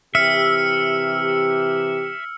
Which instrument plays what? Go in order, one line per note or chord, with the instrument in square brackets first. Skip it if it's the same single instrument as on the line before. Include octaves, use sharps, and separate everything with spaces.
[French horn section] C3 E3 G4 [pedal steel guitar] E5 [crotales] E6 F6 C#7